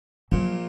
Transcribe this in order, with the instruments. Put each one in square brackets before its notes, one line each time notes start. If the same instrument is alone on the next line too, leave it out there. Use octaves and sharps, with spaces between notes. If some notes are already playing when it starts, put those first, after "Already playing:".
[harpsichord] A#1 A#2 [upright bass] F#3